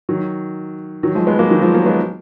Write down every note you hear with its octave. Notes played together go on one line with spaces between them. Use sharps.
D#3 F#3
D#3 F#3
F3 G#3
G#3 B3
F#3 A#3
D#3 F#3
F3 G#3
F#3 A#3
G#3 B3